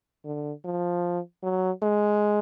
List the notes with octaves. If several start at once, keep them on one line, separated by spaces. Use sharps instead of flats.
D3
F3
F#3
G#3